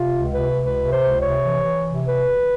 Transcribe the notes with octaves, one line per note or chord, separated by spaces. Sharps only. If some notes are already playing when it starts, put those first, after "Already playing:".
Already playing: C3 F4
C#2
C3 B4
C#2
B4
C3
C5
C#2
C3 C#5
E3
E3
C3
B4